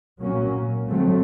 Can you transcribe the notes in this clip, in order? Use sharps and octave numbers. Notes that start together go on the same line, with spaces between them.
A#2 F#3 A#3 C#4
D3 F#3 A3 C4